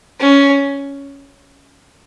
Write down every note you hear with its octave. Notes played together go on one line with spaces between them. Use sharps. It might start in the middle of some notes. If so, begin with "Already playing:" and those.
C#4